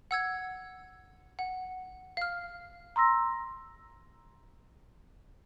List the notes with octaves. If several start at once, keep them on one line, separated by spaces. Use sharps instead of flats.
F#5 E6 G#6
F#5
F5 F6
A#5 C6 E6 A#6